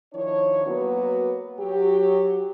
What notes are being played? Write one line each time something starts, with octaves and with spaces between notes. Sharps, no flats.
D#3 F3 D4 E4 C#5
F#3 A#3 B3 F#4 B4
F#3 G4